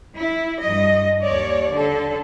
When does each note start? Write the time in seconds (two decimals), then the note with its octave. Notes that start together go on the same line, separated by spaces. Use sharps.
0.15 E4
0.60 G2 D#5
1.23 D#2 C#5 D5
1.72 D3 A4